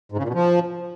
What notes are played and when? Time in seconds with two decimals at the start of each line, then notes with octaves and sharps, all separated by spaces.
0.12 G#2
0.17 C#3
0.23 A#2
0.29 B2
0.34 F3